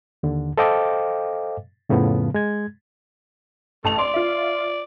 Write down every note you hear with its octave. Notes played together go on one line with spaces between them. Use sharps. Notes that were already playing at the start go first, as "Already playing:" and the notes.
D#2 D3
A4 C5 D#5 F5 G5 D6
F2 A2 C#3 F3 B3
G#3 G#6
A1 A3 A5 F7
D5 C6
F4 E5